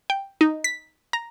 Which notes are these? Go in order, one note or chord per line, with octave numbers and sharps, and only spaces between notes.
G5
D#4
B6
A#5